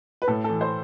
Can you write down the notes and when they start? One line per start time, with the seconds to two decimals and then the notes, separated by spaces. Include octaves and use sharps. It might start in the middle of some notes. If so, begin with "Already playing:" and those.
0.22 B4
0.28 A2 A4
0.44 A4
0.49 E3
0.61 C5